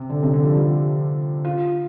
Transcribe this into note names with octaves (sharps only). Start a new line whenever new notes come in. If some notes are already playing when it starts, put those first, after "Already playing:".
Already playing: C3
D3
C3
D3
F3
G3
F4